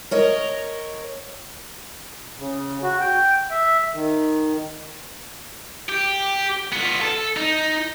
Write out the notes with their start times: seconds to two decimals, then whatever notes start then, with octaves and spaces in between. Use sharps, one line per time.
0.11 A#4 C#5 D#5
2.39 C#3
2.83 F#4
3.01 G5
3.51 E5
3.94 D#3
5.89 G4
6.73 B3 F4
7.02 A4
7.37 D#4